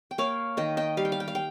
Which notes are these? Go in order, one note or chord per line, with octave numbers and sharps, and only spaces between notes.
G5
A#3 C#5 F5
D#3 D#5 G5
D#5 G5
G3 F5
G5
F5
G5
F5
G5